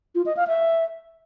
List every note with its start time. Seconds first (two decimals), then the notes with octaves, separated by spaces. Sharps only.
0.15 F4
0.26 D#5
0.37 F5
0.47 E5